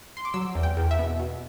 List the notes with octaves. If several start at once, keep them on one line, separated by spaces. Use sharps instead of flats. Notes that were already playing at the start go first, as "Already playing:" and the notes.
C6
D6
F#3 E6
E2
G5
E2
E5
B2
B2